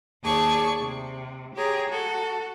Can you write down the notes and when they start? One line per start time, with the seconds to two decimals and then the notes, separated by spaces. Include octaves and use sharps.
0.23 D#2 G#4 D5 A5 C#6
0.78 C3
1.55 G4 G#4 C#5 A#5
1.89 F#4 A4